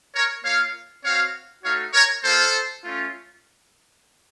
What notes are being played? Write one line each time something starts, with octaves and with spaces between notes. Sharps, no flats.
A#4 C#5
A#3 F4 C#5 F5
C4 F#4 C#5 F5
A3 D#4 F#4 C#5 F5
A#4 C#5
A#3 F4 A4 C5
A3 C#4 F4